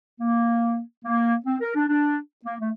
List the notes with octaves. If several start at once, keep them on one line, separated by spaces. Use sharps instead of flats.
A#3
A#3
C4
A#4
D4
D4
A#3
A3